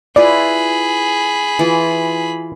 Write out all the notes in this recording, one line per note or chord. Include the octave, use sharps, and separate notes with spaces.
E4 F4 G#4 B4 D5 B5
E3 F4